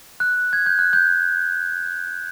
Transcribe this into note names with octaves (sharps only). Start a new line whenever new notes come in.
F#6
G#6
G6
F#6
G6